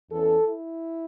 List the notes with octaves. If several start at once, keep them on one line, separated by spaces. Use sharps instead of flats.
E2 E3 C#4 A4
E4